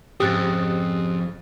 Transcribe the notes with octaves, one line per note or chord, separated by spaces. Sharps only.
F2 G#2 C#3 G4 D#6 F#6 A6